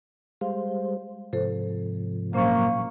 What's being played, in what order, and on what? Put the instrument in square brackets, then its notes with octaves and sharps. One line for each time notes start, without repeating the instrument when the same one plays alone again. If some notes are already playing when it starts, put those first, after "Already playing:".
[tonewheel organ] G3 G#3 C5 [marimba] F5
[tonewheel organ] G#2 C3 F3 [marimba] A4 C5
[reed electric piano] A#2 F#3 C#6 [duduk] A#3 [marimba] C#4 C5 F5